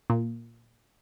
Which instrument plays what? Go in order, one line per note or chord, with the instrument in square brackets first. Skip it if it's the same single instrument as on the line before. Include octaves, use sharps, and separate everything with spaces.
[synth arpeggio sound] A#2